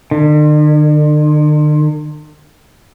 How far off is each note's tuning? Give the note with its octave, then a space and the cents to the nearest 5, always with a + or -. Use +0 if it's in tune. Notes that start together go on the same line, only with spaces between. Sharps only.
D3 +45